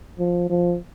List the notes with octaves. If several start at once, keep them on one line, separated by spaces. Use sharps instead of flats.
F3
F3